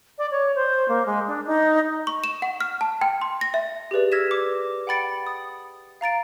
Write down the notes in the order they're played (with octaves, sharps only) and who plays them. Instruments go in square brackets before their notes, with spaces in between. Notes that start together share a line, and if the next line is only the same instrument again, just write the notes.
[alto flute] D5
C#5
C5
A#3
G#3
D4
D#4
[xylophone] C#6
E7
F#5
F6
A5
G5
C6
A#6
E5
G4 G#4 B4 D5
E6 F6 G#6 A#6 B6 E7
D6
F#5 G5 B5 A6 C#7 D7
D#6
F5 A#5 A6 D7